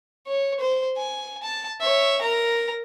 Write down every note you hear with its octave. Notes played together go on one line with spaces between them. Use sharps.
C#5
C5
G#5
A5
C#5 E5
A#4 A#5